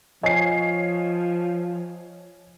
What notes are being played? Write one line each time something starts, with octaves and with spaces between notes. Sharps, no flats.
F3 C#5 D#5 G#5 C7